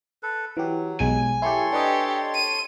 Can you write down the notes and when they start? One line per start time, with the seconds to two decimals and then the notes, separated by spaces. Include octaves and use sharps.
0.23 A4 B4
0.57 E3 F#3 G4
1.00 B1 G#3 G#5
1.42 E4 G4 A4 C#5 C6
1.73 D4 G4 B4 D#5
2.35 D#7